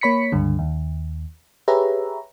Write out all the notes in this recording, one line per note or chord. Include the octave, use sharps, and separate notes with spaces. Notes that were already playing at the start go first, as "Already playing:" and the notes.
A#3 C#5 B5 B6 C#7
C#2 G2 D3
D#2
G4 G#4 B4 C#5 E5 A#5